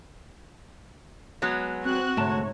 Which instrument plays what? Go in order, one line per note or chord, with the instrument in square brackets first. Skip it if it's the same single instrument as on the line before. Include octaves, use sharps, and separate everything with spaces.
[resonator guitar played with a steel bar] F#3 G#3 B3
[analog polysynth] C4 F#6 [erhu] F#4
[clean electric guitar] D2 A3 A5 [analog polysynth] G#2 C#5 [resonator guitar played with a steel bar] C3